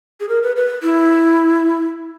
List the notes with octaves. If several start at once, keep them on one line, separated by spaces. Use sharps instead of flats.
G#4
A#4
B4
B4
E4